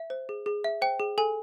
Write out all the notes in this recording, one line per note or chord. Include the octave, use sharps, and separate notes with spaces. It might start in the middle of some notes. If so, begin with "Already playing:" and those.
Already playing: E5
C5
G#4
G#4
E5
C5 G5
G#4
A4 G#5